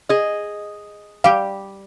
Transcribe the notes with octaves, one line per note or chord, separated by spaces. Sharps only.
G#4 D#5
G3 G4 F5